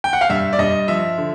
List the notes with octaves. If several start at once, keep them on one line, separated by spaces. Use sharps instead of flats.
G5
F#5
F5
G2 E5
D5
G2 D#5
F3 E5
D3